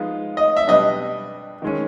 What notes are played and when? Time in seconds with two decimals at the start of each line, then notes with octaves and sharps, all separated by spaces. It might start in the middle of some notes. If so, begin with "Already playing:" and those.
Already playing: F3 G#3 B3 D#4
0.37 D#5
0.57 E5
0.67 B2 G3 B3 D4 D#5
1.62 D#3 G#3 C#4